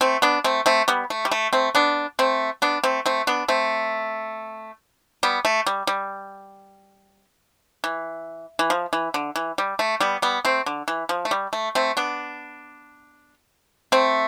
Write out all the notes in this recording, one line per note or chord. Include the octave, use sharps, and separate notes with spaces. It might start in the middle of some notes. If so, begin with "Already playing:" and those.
A3 C4
B3 D4
A3 C4
A3 C4
G3 B3
A3
G3
A3
A3 C4
B3 D4
A3 C4
B3 D4
A3 C4
A3 C4
B3 D4
A3 C4
G3 B3
A3
G3
G3
E3
E3
F3
E3
D3
E3
G3
A3
G3 B3
G3 B3
A3 C4
D3
E3
F3
A3
G3
A3
A3 C4
B3 D4
A3 C4